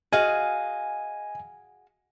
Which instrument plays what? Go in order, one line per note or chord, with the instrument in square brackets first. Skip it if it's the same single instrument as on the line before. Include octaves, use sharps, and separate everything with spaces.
[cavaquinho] F#4 G#4 F5 [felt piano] D#5 [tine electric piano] G#5